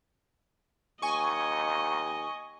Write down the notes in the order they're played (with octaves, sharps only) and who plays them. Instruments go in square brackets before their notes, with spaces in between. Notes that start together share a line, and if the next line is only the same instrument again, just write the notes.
[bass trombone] D#2 [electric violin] D#5 [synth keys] G#5 C#6